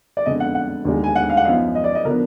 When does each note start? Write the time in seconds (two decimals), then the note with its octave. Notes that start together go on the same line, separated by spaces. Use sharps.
0.17 D5
0.26 F2 D3 G#3 B3 D#5
0.40 F#5
0.55 F#5
0.85 D#2 D3 G#3
1.04 G#5
1.16 F#5
1.30 F5
1.37 F#5
1.45 F#2 F3 B3 D#4 F5
1.75 D#5
1.84 D5
1.95 D#5
2.05 D3 F3 B3 D4 A#4